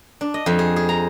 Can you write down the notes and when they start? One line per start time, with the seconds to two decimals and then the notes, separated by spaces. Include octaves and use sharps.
0.21 D4
0.34 D#5
0.46 F2
0.59 G#4
0.76 G#4
0.89 A#5